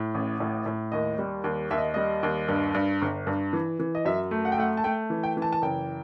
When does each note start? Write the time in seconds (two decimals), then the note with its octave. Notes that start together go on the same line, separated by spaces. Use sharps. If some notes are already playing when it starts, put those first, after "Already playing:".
Already playing: A2
0.15 A1
0.40 A2
0.66 A2
0.92 D#2 D#5
1.18 G3
1.44 D#2
1.71 D#2 E5
1.78 D#5
1.94 G3 D#5
2.23 D#2
2.48 G2
2.74 G2
3.02 G1
3.27 G2
3.53 E3
3.79 E3
3.95 D#5
4.05 F#2 E5
4.31 A3
4.45 F#5
4.52 G5
4.58 A3 F#5
4.77 A5
4.84 A3 G5
5.10 E3
5.23 G5
5.37 E3
5.42 A5
5.53 A5
5.62 F#1 G5